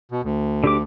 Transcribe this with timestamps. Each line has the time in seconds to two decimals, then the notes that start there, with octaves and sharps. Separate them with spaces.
0.11 B2
0.24 D2
0.64 D3 G4 D6